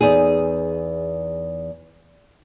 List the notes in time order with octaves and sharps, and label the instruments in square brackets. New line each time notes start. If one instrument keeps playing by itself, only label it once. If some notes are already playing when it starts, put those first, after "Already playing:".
[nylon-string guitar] E2 D#4 G#4